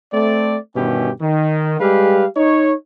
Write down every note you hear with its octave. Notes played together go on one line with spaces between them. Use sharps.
A3 C4 D5
G2 B2 D#3 E3 C#4 G4
D#3
G3 G#3 G4 B4 F5
D#4 C#5